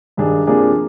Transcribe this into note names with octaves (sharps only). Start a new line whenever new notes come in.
G2 D#3 G3 D4 G#4
C3 F3 A#3 D4 G#4